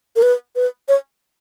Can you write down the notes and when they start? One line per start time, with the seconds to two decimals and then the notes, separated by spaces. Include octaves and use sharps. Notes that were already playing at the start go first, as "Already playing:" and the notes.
0.16 A#4
0.22 B4
0.56 B4
0.88 C#5